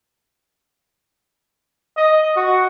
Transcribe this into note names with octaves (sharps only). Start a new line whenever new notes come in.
D#5
F#4